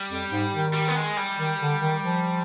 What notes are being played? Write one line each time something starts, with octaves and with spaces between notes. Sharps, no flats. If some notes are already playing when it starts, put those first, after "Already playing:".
Already playing: G3
F2
G#2
D#3
G3
B3
G#3
G3
D#3
D3
D#3
F3